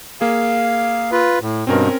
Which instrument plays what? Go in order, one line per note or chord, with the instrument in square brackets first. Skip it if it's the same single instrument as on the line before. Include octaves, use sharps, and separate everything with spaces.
[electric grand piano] A#3 G#4 [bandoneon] F5
[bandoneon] F4 B4
A2
[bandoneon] G2 B2 [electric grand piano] C4 C#4 A#4